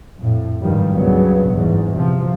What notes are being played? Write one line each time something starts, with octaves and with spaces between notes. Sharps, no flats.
F2 A2
G#1 G2 D#3 F3 G3
C#2 G2 C#3 F#3 B3
G1 E2 G#2
C3 F3